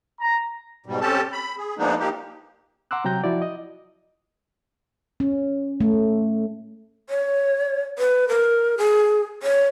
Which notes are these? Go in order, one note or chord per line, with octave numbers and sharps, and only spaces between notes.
A#5
G#2 B2 G3
C4 C#4 G4 A4 A5
B5
G#4
F3 G#3 A#3 B3 D4 D#4
F3 A#3 D#4 G4
F#5 A#5 C6 D6 E6 F#6
C3 F#3 G5 A#5 G6
F3 E4 F#4 D5
D#5
C#4
A3
C#5
B4
A#4
G#4
C#5